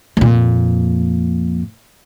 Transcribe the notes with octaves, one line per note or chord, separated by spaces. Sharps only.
F2 A#2